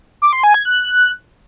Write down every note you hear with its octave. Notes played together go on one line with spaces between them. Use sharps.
D6
C6
G#5
G#6
F#6